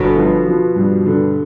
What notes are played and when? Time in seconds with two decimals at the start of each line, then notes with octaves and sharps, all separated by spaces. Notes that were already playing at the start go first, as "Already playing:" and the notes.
Already playing: G1 B2 D3
0.16 F3
0.46 F3
0.76 G2
1.06 D3